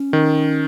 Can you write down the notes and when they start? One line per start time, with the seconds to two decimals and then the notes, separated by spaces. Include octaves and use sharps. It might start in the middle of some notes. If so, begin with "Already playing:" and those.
Already playing: C#4
0.13 D#3